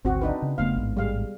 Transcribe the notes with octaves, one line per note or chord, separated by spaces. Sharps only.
G#1 D2 C4 F#4
D4 D#4 B4
C#3
F1 C#3 A3 B3 F5
A1 G#2
G3 G#3 F5